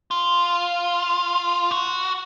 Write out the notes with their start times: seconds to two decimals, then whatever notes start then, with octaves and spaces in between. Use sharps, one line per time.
0.11 F4
1.71 F#4